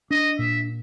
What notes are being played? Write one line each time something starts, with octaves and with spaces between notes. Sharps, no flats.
D4 D#5
A#2 E5